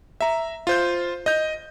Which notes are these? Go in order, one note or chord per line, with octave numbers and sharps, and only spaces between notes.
E5 A#5
F4 C5 G6
D#5 G6